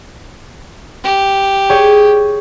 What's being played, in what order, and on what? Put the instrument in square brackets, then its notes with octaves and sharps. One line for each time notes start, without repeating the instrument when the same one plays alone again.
[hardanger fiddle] G4
[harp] G#4 C#5 G5